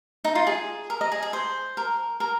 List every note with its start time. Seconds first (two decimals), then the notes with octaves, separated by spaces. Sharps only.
0.24 D#4
0.35 F4
0.47 G#4
0.90 A#4
1.01 D#5
1.12 G#4
1.22 G#4
1.33 C5
1.77 A#4
2.20 A#4